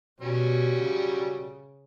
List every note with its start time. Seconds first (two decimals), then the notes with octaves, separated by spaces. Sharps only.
0.20 B2 F#3 G3 C#4
0.81 C#3